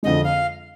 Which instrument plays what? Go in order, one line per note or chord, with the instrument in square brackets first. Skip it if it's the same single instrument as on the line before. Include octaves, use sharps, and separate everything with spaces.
[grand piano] F2 D3 G#3 [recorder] D#5
[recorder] F5